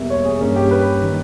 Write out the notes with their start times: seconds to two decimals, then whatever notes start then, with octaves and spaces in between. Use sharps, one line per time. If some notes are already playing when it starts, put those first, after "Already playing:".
Already playing: E2 B2 G3 A#3 E5
0.10 C#5
0.25 G#4
0.41 G2 G3 A#3 C#4
0.56 G4
0.71 B4
1.02 D#3 A#3